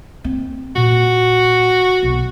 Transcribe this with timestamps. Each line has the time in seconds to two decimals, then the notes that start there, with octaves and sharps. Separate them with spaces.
0.24 C4
0.76 A#2 F#4
2.03 B1